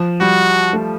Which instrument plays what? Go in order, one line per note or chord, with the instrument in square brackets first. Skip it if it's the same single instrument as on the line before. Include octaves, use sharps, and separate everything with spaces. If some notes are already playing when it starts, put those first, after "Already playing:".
Already playing: [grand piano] F3
[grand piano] G3 [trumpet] F#4
[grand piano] A3